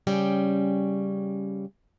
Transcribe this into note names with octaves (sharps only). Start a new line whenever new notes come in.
C#3 G3 C#4 G5